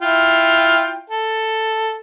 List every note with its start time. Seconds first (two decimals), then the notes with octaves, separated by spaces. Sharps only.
0.01 E4 F4 G5
1.10 A4